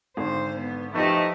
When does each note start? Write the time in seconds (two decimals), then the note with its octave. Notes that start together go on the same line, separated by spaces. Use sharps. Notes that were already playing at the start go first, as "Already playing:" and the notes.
0.17 G#1 D3 C5
0.58 B3
0.94 F3 A3 D#4 E4 G4 B4 D#5